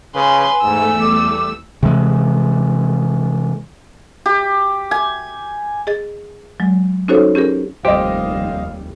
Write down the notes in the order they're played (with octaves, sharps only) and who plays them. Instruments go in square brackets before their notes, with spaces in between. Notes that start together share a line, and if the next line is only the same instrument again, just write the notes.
[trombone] C#3 [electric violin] B4 C6 [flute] G#5
[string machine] E2 A3 [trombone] G#2 [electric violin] E6
[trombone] G3 [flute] D6
[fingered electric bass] C3 E3 G#3
[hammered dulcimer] G4
G#5
[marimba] G#4 D#5 A6
F#3 G#3
C#4 D#4 F#4 A4 C5 C#5
C#4 G4 G#4 A#4
[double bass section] F1 D#2 G3 [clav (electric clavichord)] G4 [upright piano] C5 D#5 [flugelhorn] F5